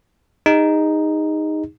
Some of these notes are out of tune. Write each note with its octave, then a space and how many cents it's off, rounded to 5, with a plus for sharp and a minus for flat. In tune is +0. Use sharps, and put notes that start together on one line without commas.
D#4 +0 G#4 -35